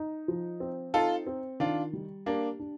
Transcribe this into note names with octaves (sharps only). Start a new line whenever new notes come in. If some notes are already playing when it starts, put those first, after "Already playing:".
Already playing: D#4
F3
C4
D#4 F4 A4
C4
D#3 D4 F4
G3
A#3 D4 G4
D4